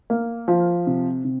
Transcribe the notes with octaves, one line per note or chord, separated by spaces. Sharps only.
A#3
F3
C3
C3